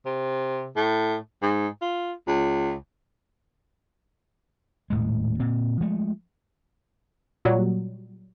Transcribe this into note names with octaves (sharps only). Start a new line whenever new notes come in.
C3
A2
G#2
F4
C#2
D#1 A2 G#3
A#2 C4
F3 G#3 A3
A#2 F#3 G3